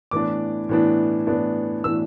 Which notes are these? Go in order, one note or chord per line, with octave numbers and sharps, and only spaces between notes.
A2 E3 B3 D4 D6
A2 E3 B3 D4
A2 E3 B3 D4
A2 E3 B3 D4 E6